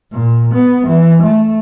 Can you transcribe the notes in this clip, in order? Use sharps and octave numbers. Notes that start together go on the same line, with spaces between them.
A#2
B3
E3
A3